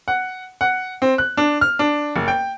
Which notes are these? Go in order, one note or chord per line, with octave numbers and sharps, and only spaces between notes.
F#5
F#5
C4
F#6
D4
F6
D4
F#1
G5